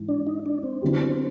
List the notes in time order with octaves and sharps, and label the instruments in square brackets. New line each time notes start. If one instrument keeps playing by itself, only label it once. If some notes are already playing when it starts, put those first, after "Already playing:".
Already playing: [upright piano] G#2 E3
[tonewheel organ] D4
D#4
D4
C4
[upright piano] D3 F#3 B3 E4 G4